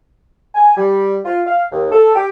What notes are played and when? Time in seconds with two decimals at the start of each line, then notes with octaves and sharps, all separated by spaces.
0.55 G#5
0.77 G3
1.24 F4
1.47 F5
1.72 D#2
1.92 A4
2.15 G4